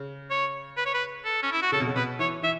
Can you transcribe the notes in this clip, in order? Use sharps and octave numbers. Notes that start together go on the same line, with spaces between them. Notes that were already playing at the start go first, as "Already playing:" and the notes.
Already playing: C#3
C#5
B4
C#5
B4
A4
C#4
E4
F#4
C#3 A4
B2
C#3
B2 B4
E3 C#5
E3 E5